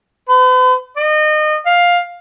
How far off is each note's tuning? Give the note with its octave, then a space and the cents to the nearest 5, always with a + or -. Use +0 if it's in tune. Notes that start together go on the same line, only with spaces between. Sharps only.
B4 +45
D#5 -30
F5 +10